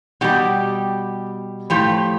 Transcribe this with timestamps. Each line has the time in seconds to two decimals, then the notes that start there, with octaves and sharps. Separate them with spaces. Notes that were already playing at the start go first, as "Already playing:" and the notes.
0.21 B2 G3 G4
1.70 A2 F3 G4